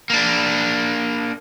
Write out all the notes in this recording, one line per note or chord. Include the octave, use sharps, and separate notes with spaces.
A#3 D4